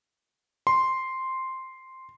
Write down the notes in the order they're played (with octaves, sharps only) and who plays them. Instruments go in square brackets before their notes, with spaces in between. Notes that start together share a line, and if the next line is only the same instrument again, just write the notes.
[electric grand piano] C6